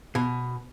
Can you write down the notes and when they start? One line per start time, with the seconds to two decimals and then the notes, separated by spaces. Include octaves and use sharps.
0.15 B2